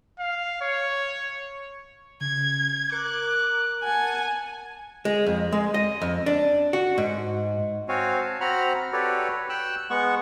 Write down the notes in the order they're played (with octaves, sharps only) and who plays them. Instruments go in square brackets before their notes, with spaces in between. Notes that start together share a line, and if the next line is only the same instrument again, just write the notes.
[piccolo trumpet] F5
C#5
[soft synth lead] C#3 [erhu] G#6
[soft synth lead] A#4 [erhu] D6 [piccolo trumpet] F#6
[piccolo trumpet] F#5 [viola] G#5 [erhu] A5
[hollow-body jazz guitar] G#3
F2
G#3
D#5
F2
D4
F#4
G#2
[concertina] C4 F#4 C#5 F5 G#5
A5
C4 F#4 F#5 A#5 B5 F6
F#4 G4 A4 B4 C#5 D5
G5 E6 F#6
G#3 B3 F#5 C#6